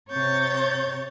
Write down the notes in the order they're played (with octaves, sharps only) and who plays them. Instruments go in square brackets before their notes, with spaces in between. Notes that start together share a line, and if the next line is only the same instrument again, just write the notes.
[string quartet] C3 C#5 C#6 G6 A6